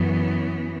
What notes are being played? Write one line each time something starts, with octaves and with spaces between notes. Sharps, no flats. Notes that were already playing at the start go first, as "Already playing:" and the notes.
Already playing: F#2 E3 B3